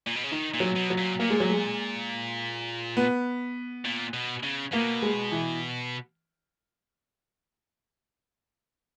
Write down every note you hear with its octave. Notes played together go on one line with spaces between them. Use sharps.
A#2
B2
C#3
D#3 D#4
A#2
F#3
B2
F#3
A#2
A#2 A#3
G#3
F#3
G#3
B3
A#2
B2
C#3
B2 A#3
G#3
E3